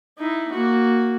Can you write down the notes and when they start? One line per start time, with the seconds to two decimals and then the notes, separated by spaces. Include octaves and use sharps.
0.18 D#4 E4
0.52 A#3 F#4